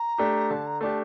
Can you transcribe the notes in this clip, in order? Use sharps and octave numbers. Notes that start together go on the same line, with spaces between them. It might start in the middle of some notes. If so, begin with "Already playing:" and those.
Already playing: A#5
A3 D4 G4
D3 A5
A#5
A3 D4 G4 A5